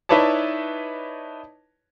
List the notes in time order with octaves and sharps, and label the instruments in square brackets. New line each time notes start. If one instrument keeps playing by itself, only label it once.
[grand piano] D#4 E4 B4 C#5 D5 A5